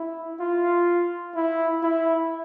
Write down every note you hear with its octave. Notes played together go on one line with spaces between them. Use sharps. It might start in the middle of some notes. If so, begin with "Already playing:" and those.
Already playing: E4
F4
E4
E4